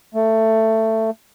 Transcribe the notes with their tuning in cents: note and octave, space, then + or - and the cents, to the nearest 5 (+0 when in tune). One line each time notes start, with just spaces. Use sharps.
A3 +15